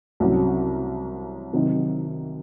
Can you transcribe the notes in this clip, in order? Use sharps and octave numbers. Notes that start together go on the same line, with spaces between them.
C2 C3 F#3 C#4 F#4
C3 D#3 F#3 C4 D#4